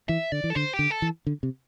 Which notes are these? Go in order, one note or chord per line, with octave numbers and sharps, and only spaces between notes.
E3 E5
D3 D5
E3
A4
D3 C5
G4
D3
A4
E3
D3
C3